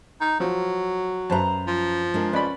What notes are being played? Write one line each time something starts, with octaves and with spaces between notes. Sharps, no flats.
D#4
F3 F#3
F#2 B4 C5 A5 A#5
F3
G#3 D4 A#4
C#4 B4 D5 B5